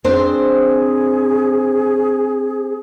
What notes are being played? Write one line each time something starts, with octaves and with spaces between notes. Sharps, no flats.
C4 D4 G#4 C5